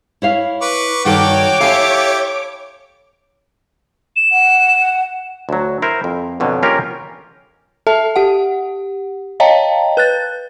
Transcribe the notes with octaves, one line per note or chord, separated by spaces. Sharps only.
E4 C#5 F5
B4 C#6 D6
G2 D#3 F#4 A4 C#5 G5 D6
E4 G4 A4 F5 G#5
E7
F#5
D2 F#3
E4 A#4 C5
F2
F2 B2 D3 F#3
A#3 C#4 F4 G4 A#4 A#5
A4 E5 A5
G4 F#5
C#5 D#5 F5 G5 A5 A#5
B4 F#6 A6